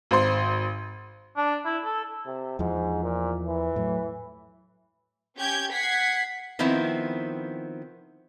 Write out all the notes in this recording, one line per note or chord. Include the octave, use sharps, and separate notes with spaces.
G#1 C5 C6
D4
E4
A4
C3
E2 G#2 F3
A#2
E3
A2 F#3
C#4 G4 G6 G#6
F#5 G#6 B6 C7
D#3 F3 B3 C4 E4